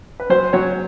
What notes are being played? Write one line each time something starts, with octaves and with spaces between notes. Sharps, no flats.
B4
F#3 C5
F#3 C#5